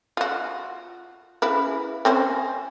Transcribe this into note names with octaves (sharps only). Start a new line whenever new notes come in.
F4 F#4
C#3 E4 B4
C4 C#4 C5